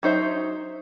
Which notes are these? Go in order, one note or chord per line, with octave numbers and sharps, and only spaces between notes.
F#3 D#4 C5 E5